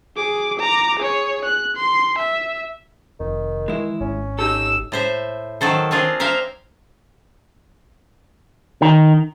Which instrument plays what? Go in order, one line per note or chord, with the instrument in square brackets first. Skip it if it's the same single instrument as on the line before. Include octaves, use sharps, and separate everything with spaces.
[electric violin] G#4 D6
A#5 D6
G#4 C#5
F#6
C6
E5
[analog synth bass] F1 [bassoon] D#3
[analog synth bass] E3 [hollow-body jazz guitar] G#3 E4
[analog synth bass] G#1 [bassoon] C#4
[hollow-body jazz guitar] D#4 G4 A4 [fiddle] E6
[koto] A2 C5 E5
D#3 F#3 A4 C5
C4 D4 F4 G#4
A#4 C5 E5 F5
[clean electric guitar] D#3